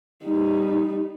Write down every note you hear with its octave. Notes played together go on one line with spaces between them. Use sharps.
G3 D#4